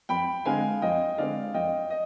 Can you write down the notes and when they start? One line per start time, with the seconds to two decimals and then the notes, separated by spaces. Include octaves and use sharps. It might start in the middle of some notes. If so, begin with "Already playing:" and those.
0.09 F2 G5 B5
0.45 D3 G#3 C4 F5 G#5
0.82 F2 D#5 G5
1.18 D3 G#3 C4 D5 F5
1.54 F2 D#5 G5
1.90 D#5